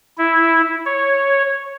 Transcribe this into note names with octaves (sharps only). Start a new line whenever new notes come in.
E4
C#5